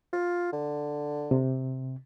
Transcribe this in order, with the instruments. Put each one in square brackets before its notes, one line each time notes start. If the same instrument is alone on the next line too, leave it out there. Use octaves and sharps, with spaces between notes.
[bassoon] F4
D3
[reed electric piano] C3